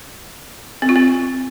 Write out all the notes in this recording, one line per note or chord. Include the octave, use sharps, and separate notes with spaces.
C4
F4
C4